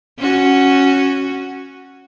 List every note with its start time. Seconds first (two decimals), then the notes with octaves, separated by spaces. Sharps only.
0.18 C#4 F#4